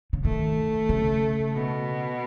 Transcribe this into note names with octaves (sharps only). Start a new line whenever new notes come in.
C#3
D#3 A3
C#3
B2